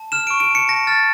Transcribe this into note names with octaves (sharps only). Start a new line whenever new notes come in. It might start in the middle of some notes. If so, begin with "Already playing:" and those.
Already playing: A5
F6 E7
C#6 D7
D7
A5 C#7
A5 A#6
F6 A6